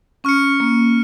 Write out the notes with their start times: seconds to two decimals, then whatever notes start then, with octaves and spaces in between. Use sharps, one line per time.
0.24 C#4 C#6 F6 C#7
0.60 A#3